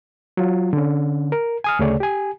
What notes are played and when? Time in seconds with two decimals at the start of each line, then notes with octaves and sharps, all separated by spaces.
0.37 F#3 F4
0.73 D3 C#4
1.32 A#4
1.64 G#5 D#6 F6
1.79 D2 C#3 A3 G#4 C#5 D5
2.00 G4 G#5